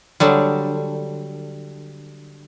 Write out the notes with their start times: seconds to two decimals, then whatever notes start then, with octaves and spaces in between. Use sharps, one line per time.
0.20 D3 F#3 G3